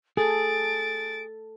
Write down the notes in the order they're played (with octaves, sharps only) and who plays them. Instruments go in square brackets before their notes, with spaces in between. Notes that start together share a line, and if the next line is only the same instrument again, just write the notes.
[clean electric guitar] G#4 [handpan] A4 [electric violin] A6 [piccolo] D7